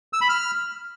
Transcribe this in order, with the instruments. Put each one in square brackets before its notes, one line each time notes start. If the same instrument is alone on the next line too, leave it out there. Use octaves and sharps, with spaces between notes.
[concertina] E6
B5
F6